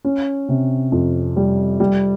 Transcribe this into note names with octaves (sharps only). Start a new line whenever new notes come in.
C#4
C3
F2
G3
G3